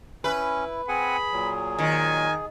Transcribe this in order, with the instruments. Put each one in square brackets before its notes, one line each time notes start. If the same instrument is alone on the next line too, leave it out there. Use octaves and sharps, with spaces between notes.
[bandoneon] C#4 [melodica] E4 [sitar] B4
[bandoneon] C4 F#5 G#5 [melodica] G#4 [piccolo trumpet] B5
[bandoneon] A#2 F#3
[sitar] D#3 [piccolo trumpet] G#5